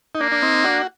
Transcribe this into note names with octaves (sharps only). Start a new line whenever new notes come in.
D#4
A#3 D4
D4
C4 D#4
D4 F#4